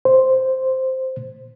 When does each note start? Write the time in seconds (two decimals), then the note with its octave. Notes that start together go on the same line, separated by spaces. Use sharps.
0.05 C5